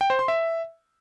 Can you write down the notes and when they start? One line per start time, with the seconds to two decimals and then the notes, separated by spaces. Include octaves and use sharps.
0.01 G5
0.10 C5
0.19 C6
0.28 E5